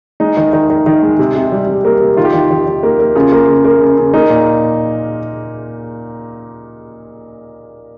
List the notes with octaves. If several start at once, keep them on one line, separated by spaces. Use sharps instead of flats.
G#3 D#4
D#3
D#3
D#3
D#3
G#3
C3
C3
G3
C3
A#3
C3
D#3 F4
G4
D#3 F4
D#3
D#3
A#3
A#3
C#3 F4
A#3
C#3
A#3
C#3
C#3
A#3 D#4
A#2